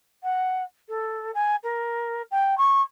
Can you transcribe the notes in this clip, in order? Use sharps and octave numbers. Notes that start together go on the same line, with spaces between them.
F#5
A4
G#5
A#4
G5
C#6